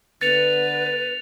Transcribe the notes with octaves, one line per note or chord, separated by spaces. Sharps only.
D3 B3 B4 A6 C#7 F7